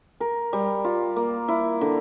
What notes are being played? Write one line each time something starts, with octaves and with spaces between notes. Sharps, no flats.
A#4
G3
F4
A#3
E4
D3